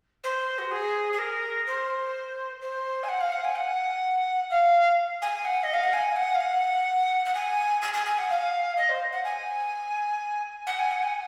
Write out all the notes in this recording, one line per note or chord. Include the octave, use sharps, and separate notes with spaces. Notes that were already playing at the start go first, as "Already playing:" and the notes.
C5
F#4
G#4
G#4
A#4
C5
C5
G#5
F#5
F5
F#5
G#5
F#5
F5
G#5
F#5
D#5
F5
F#5
G#5
F#5
F5
F#5
F#5
G#5
G#5
G#5
G#5
F#5
F5
D#5
C5
F#5
G#5
F#5
G#5
F#5
G#5